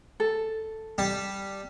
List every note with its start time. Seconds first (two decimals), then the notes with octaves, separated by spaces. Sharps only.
0.20 A4
0.98 G3 A5